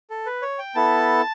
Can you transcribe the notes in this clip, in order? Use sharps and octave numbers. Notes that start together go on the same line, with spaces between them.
A4
B4
C#5
G5
B3 E4 A4 A5